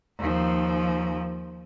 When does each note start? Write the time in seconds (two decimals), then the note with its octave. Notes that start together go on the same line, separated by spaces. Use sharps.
0.19 D#2 F3